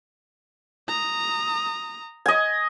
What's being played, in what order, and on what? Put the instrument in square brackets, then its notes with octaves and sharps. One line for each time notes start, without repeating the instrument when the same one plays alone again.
[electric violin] A#5 D#6
[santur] D#5 G#5